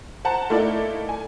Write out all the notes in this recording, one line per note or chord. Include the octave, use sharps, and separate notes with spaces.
C5 F#5 A5 A#5
A3 A#3 D#4 E4 A4 D5
G#5